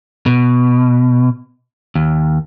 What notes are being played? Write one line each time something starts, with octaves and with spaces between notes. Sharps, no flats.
B2
D#2